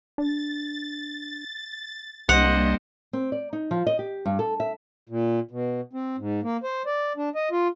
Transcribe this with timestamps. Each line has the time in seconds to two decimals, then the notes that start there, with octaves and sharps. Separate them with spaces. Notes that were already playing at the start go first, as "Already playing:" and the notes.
0.18 D4 A6
2.29 C2 G3 A#3 D4 C5 D#5 F#5
3.13 C4
3.32 D5
3.53 D#4
3.71 F3
3.87 D#5
3.99 G4
4.26 G2
4.39 A4
4.60 E5
5.09 A#2
5.51 B2
5.93 C4
6.18 G#2
6.43 A#3
6.63 C5
6.86 D5
7.17 D4
7.35 D#5
7.51 F4